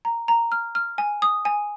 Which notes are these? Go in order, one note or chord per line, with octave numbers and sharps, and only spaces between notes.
A#5
A#5
F6
F6
G#5
D#6
G#5